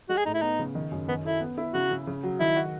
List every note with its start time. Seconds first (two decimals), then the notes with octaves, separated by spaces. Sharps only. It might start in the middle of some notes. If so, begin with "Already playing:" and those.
0.09 G#3 F#4
0.17 G#4
0.26 A2 D#4
0.34 E4
0.42 B3 D#4
0.59 C#3
0.75 D#3
0.91 F#2
1.08 D#3 B3
1.25 E4 A4
1.41 B3
1.58 E4
1.74 C#3 F#4
1.91 C#3
2.07 C#3
2.24 F#3
2.40 D#3 E4
2.56 F#4